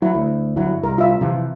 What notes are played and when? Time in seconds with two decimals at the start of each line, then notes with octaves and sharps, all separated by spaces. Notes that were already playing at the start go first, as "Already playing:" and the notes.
0.02 F#3 E4
0.15 D2
0.56 G1 F#3 E4
0.83 C2 A#4
0.98 F4 E5
1.21 C3 E3 F3